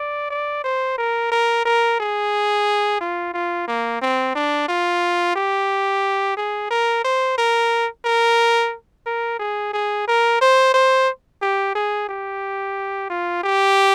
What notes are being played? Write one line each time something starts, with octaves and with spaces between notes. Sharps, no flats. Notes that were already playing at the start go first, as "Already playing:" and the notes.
Already playing: D5
D5
C5
A#4
A#4
A#4
G#4
F4
F4
A#3
C4
D4
F4
G4
G#4
A#4
C5
A#4
A#4
A#4
G#4
G#4
A#4
C5
C5
G4
G#4
G4
F4
G4